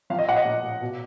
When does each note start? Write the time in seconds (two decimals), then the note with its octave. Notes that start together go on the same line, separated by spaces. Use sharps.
0.10 F3 F5
0.19 D#5
0.28 A#2 F#5
0.36 D#5
0.45 A#2
0.63 A#2
0.81 B2